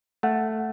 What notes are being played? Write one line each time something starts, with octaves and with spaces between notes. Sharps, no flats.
A3 F#5